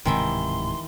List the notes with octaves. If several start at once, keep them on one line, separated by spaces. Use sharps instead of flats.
D1 G#2 C3 D#3 E3 E5 C6